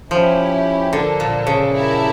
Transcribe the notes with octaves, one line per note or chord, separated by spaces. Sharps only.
F3 C#4 E4 G4
D3 A#3 D4 A4
A#2
C#3
E4 G4 A#4 E5 A5